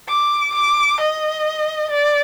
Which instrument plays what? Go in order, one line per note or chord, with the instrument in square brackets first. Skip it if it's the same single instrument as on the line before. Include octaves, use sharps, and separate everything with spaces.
[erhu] D6
D6
D#5
D5